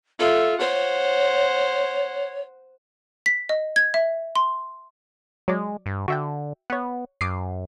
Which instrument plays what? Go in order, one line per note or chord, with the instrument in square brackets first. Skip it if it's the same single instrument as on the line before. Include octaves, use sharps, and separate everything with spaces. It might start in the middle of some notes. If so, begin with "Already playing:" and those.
[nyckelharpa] F4 E5 [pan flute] A4
[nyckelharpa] C5 F#5 [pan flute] C#5
[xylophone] B6
D#5
G#6
E5
C6
[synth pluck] F#3 D5 [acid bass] G#3
[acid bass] G2
[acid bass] D3 [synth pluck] F#4 E5 G5
[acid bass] B3 [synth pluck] C#5 F#5
[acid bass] F#2 [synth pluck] D6 D#6 C7